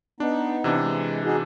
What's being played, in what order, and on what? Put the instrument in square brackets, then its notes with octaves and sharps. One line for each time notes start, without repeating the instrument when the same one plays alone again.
[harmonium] B3 D#4 [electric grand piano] D4
[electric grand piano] C3 E3 D4
[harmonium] G#3
D#4 F#4 G#4